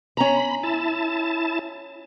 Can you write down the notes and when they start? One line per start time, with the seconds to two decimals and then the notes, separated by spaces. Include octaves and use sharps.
0.17 C#4 A#5 B5
0.63 E4 A5